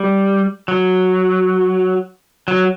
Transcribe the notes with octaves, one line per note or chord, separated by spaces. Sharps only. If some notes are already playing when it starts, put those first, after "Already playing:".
Already playing: G3
F#3
F#3